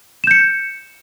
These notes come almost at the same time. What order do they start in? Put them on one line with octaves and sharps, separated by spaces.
E7 G6 C#7